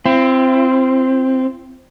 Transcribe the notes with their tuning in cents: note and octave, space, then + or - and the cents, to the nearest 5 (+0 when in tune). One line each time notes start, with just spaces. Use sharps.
C4 +0 F4 -45